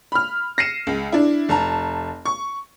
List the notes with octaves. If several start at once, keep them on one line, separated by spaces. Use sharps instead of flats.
B5 F6
A#6 C7 C#7 D#7 E7
C#2
D4 E4
F1 A5 A#5
C#6